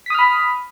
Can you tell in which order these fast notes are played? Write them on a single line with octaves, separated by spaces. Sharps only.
B6 D#6 F6 B5